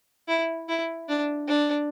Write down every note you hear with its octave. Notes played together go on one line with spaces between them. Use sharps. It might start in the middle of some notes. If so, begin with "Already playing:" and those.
E4
E4
D4
D4